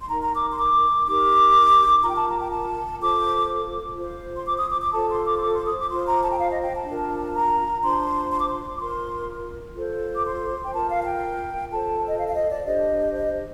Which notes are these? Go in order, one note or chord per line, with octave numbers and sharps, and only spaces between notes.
C6
D#4 A#4 A#5
A#5
D6
C6
D6
D#4 G4 A#4 D6
F4 A#4 A#5
G5
A5
A#5
G5
A5
F4 A4 C5 D6
F4 C5
C6
D6
D#6
D6
D6
F4 A4 C5 A5
C6
D6
C6
D6
C6
D#6
D6
F4 C5 C6
A#5
A5
G5
F5
D#5
G5
A5
D4 F4 A#4
A#5
D4 F4 C5 C6
C6
D6
C6
D6
F4 A#4 C6
F4 A4 C5
D6
C6
G5
F4 A#4 A5
F5
A5
G5
F4 A4 C5 A5
D#5
F5
F5
D#5
D5
D4 G4 C5 D#5
D#5